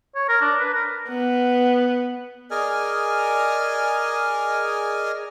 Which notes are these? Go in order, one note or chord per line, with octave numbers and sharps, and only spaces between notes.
C#5
A#4
D4
B4
A#4
B3
G#4 A#4 D5 D#5 G#5 F6